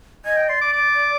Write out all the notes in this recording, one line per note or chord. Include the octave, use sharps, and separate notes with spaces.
D#5 G#5
G5
D5 C6
D6
D6